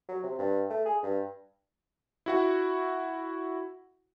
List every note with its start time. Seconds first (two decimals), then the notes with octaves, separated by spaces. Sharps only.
0.09 F#3
0.23 C3
0.39 G2
0.70 A3
0.85 G#4
1.03 G2
2.26 E4 F#4 F#5